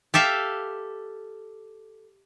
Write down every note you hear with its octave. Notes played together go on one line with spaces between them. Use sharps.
G4 A4 E5 F5